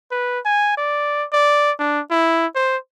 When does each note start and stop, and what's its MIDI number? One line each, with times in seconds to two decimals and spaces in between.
0.11 0.39 71
0.45 0.73 80
0.77 1.26 74
1.33 1.72 74
1.79 2.00 62
2.11 2.46 64
2.55 2.77 72